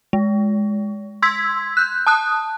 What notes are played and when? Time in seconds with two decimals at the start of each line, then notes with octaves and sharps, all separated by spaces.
0.13 G#3
1.22 C6 E6 G#6 B6
1.77 F#6 G6
2.07 A5 D#6 F#6